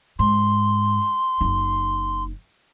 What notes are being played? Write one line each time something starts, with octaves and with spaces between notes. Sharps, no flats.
G#2 C6
F#1 D#4